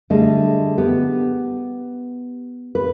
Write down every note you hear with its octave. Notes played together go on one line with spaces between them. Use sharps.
D3 G3 A3 G#4 D#5
B3 G4
B4